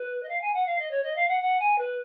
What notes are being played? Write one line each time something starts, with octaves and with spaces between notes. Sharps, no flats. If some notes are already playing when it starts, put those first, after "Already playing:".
Already playing: B4
D#5
F5
G#5
F#5
F5
D#5
C#5
D#5
F5
F#5
F#5
G#5
B4